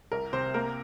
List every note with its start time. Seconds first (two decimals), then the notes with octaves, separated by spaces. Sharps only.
0.12 C2 A#4
0.33 C3 C5
0.54 A#3 A#4